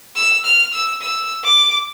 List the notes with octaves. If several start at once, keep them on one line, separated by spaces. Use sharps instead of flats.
E6
F6
E6
E6
D6